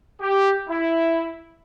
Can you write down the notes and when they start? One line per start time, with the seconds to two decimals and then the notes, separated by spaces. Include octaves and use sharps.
0.21 G4
0.69 E4